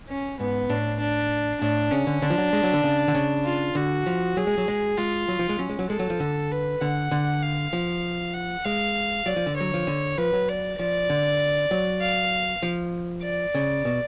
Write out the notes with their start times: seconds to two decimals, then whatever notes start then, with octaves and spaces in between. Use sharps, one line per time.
0.08 C#4
0.40 G#2 B3
0.69 A2 D4
1.00 D4
1.61 A2 D4
1.92 C#3 C#4
2.07 D3
2.22 D3 D4
2.30 F3
2.38 F#3
2.53 G#3
2.63 F#3
2.73 D3
2.83 C#3
3.08 D3
3.14 C#3
3.45 F4
3.75 D3 F#4
4.06 F3
4.37 F#3 G#4
4.47 G#3
4.58 F#3
4.68 G#3
4.98 G#3 F4
5.28 F#3
5.39 F3
5.49 G#3
5.59 F#3 C#4
5.69 G#3
5.79 F#3
5.90 G#3 A4
5.99 F#3
6.10 F3
6.20 D3
6.51 B4
6.81 D3 F#5
7.11 D3
7.42 F5
7.73 F3
8.34 F#5
8.65 G#3 F5
9.26 F#3 D5
9.36 F3
9.46 D3
9.56 F#3 C#5
9.74 F3
9.87 D3
10.18 F3 B4
10.33 F#3
10.49 D5
10.79 F3 D5
11.10 D3
11.71 F#3
12.01 F5
12.63 F3
13.23 D5
13.55 C#3
13.85 B2